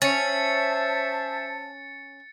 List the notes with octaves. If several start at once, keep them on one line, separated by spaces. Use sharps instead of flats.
C#4 C5 E5 A5 A6 C#7